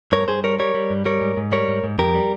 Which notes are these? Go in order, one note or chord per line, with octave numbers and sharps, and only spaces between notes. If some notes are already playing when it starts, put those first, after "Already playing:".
G2 A#4 C#5
G2 G#4 C5
G3 A#4 C#5
G3 A#4 C#5
G3
G2
G3 A#4 C#5
G#2
G#2
G3 A#4 C#5
G#2
G#2
F2 G4 A#4
G3